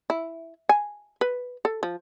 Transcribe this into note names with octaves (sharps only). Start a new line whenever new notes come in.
E4
G#5
B4
A4
F3